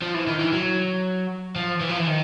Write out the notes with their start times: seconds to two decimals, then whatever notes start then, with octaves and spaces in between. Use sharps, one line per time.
0.02 F3
0.14 E3
0.27 D#3
0.39 E3
0.53 F#3
1.56 F3
1.81 E3
1.89 F3
1.98 E3
2.07 D#3